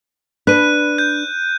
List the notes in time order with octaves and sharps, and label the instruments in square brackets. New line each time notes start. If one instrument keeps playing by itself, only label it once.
[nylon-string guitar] D4 B4 [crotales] F#6 D#7
[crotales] G6